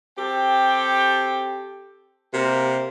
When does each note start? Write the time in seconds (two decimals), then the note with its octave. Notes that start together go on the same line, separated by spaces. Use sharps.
0.18 C4 G4 A4 G5
2.34 C3 A#3 A#4